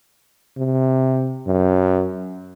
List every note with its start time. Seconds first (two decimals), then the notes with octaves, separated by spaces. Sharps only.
0.57 C3
1.47 F#2